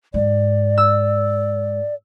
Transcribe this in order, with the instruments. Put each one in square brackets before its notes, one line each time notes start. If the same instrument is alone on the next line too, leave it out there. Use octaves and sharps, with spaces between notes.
[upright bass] G#2 [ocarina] D5
[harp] E6